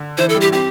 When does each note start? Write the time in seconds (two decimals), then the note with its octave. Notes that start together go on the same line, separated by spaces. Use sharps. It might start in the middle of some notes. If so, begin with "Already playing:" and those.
Already playing: D3
0.18 E3 C5
0.29 A4
0.35 G3
0.41 G4
0.52 C4 G4